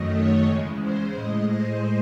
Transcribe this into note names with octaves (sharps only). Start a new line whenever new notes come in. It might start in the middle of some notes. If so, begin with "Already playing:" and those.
Already playing: F#2 D#3 F#3 A3 D#5
C#5
E2 C#3 G#3
C5
A2 G#3 D#5
C5